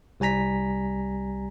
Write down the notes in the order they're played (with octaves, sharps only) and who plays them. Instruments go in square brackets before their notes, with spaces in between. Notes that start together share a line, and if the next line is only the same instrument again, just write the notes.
[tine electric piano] C2 G3 G#5 A#5 B6